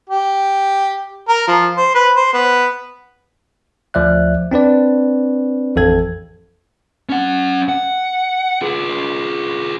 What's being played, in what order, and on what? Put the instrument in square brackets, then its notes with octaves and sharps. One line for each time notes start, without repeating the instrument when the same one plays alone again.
[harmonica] G4
A#4
F3
C5
B4
C5
B3
[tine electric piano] D2 F3 D5 E5 F#6
C4 D4 B4 D5
A1 F2 A4 G#6
[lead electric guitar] C#4 F#5
F#5
F4 G#4